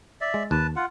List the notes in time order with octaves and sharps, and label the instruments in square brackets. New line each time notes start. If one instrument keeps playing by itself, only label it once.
[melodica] D5 E5
[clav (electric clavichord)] G#3
[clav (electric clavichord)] D#2 [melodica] B4 A5
[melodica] F4 F#5